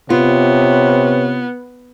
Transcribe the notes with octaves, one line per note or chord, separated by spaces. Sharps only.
C3 B3 F4 C#5